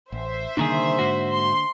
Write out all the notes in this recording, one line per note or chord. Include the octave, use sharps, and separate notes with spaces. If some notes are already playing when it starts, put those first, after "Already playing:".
A1 C5 E5
C2 D3 D#3 A#3 D4 G#4
G#2 F#4
C6